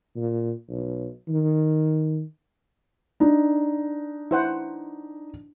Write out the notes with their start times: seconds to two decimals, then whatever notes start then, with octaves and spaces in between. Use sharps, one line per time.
0.16 A#2
0.70 B1
1.29 D#3
3.20 D4 D#4
4.31 E4 C5 F#5